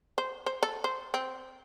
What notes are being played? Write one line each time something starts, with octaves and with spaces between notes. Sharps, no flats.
C5
C5
A4
C5
C4